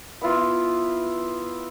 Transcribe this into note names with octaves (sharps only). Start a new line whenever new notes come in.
B3 E4 F4